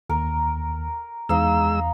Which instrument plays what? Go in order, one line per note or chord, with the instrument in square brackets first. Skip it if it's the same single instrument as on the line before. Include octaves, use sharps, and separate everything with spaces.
[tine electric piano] D#2 [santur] A#4
[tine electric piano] E2 [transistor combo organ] G#3 E6 [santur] D#4 D#5 F5